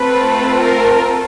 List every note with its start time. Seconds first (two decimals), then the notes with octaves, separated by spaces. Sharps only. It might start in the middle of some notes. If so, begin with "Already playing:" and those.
Already playing: A3 C4 F4 A4 B4
0.62 A#4